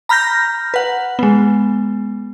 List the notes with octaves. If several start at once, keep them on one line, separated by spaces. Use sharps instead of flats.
A#5 B5 F6 G6 A#6
B4 F#5
G#3 B3